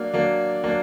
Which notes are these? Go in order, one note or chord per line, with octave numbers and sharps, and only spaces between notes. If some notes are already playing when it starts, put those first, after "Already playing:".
Already playing: F#3 A#3 D4
F#3 A#3 D4
F#3 A#3 D4